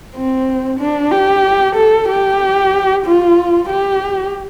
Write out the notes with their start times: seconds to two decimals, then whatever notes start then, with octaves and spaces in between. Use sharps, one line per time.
0.15 C4
0.80 D4
1.11 G4
1.76 A4
2.08 G4
3.06 F4
3.69 G4